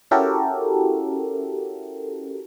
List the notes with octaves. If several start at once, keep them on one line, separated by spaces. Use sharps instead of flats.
C#4 E4 F#4 G4 A4 A#4